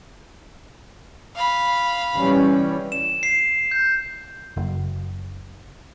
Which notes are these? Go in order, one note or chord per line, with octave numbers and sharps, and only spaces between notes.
F5 B5
E3 G3 C#4
E7
C7
G6
F#1